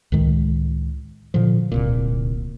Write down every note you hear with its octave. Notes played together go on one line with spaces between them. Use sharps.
C#2 A2 D#3 G#3
A#2 D3 F3
D1 C2 A#2